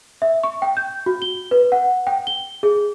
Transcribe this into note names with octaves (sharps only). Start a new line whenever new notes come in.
E5
C#6
G5
G6
F#4
G7
B4
F#5
G5
G7
G#4